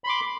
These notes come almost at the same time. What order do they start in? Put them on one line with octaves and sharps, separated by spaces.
B5 C6 D6